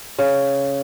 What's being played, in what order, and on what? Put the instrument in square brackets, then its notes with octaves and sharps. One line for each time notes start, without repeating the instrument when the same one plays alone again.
[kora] C#3